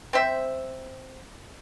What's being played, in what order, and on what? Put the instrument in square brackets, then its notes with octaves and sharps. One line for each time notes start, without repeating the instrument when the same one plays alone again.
[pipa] C4 C5 E5